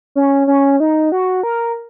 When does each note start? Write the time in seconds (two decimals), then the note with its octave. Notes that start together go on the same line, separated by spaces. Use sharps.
0.15 C#4
0.47 C#4
0.80 D#4
1.12 F#4
1.43 A#4